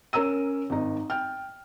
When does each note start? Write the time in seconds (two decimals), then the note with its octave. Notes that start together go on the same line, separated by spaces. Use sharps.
0.13 C#4 A#4 C#5 A#5 E6 D#7
0.70 G#1 D#4
1.10 G5 F6